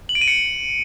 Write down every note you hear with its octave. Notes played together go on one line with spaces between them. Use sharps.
F#7
D7
D#7
C#7